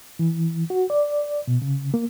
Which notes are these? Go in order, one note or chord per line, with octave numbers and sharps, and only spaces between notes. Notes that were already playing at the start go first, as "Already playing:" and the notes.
E3
F#4
D5
B2
C#3
A#3